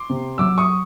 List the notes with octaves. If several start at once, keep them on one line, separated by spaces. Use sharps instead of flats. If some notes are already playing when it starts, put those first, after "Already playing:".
Already playing: C6 D6
C3
F#3 D6 E6
C#6 D#6